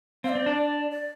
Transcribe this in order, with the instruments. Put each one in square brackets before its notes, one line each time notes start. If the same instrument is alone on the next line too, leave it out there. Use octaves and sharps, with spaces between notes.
[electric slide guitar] C4 [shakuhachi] F5
[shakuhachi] D5
[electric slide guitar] C4
D4
[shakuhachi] D5